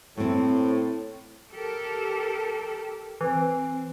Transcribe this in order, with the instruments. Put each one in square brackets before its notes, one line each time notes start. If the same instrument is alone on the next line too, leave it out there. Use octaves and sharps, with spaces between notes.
[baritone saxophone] A2 [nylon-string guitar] A3 C4
[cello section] G4 A4 A#4
[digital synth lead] E3 [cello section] C4